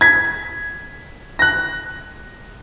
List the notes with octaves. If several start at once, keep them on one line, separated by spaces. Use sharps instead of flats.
G#6 B6
F#6 A#6